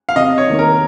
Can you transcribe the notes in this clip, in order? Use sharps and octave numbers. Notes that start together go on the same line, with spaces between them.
F5
C3 D#5
C#5
D#3 A#3
A#4